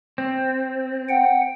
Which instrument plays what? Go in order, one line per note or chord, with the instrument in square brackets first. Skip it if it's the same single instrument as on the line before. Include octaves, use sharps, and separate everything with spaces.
[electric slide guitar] C4
[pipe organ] F#5 G5